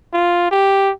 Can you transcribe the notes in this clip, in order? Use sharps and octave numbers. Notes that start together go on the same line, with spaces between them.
F4
G4